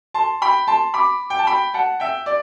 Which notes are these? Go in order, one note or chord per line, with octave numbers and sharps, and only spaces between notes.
A5 C6
G5 B5
A5 C6
B5 D6
G5
A5
G5 B5
F#5 A5
E5 G5
D5